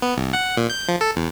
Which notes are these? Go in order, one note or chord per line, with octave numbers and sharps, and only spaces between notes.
B3
C2
F#5
A#2
G6
F3
A4
E2